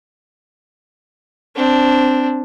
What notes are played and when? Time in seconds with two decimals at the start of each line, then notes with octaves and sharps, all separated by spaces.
1.56 C4 D4